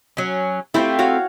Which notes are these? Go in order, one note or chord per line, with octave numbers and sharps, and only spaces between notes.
F#3 C#4
A3 C4 E4 F4 G4 C5
F#4 C#5 F5